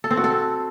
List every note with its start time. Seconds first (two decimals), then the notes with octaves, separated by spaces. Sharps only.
0.04 A4
0.11 C4
0.17 F#4
0.24 A4